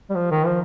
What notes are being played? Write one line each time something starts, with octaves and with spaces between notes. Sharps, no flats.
G3
F3
D#3
F3